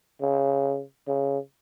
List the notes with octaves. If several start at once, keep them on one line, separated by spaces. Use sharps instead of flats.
C#3
C#3